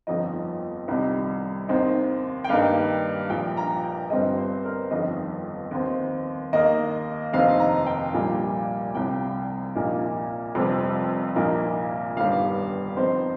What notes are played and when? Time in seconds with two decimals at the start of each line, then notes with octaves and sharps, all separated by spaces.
0.07 G1 F2 F3 D#4 D#5
0.88 C2 C3 D#3 G3 D#4
1.68 D#2 D#3 C4 D#4
2.44 G5
2.49 G2 D#3 G3 A#3 D#4 F5
3.30 A#1 A#2 F3 G5
3.57 A#5
3.84 G5
4.10 G1 G2 G3 C4 D#5
4.38 C5
4.65 A#4
4.91 G1 F2 D#3 D#5
5.71 D#2 D#3 C4
6.53 D#2 D#3 A#3 D#5
7.33 F1 D#2 D#3 C4 D#4 F5
7.60 A#5
7.86 G5
8.13 A#1 A#2 G3 A#3
8.95 C2 C3 G3 G5
9.75 A#1 A#2 A#3 D#4
10.55 F1 F2 C3 G3 C4
11.36 A#1 A#2 A#3 D#4
12.17 G1 G2 D#3 G3 F5
12.97 F2 D#3 C4 D#4 C5